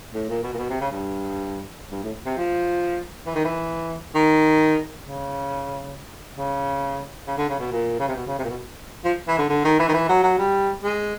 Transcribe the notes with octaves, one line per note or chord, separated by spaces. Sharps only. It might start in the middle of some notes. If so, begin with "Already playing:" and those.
A2
A#2
B2
A#2
B2
C3
C#3
G2
G2
A2
C3
F3
E3
D#3
E3
D#3
C#3
C#3
C#3
D3
C#3
B2
A#2
C#3
C3
B2
C#3
C3
A#2
B2
F3
E3
D3
D3
D#3
E3
D#3
E3
F#3
F#3
G3
G#3